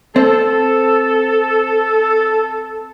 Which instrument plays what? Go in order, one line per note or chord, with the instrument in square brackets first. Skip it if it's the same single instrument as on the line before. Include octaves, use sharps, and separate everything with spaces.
[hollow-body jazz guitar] C4 [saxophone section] A4